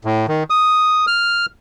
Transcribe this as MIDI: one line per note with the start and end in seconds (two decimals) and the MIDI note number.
0.05 0.26 45
0.28 0.43 51
0.50 1.05 87
1.07 1.46 89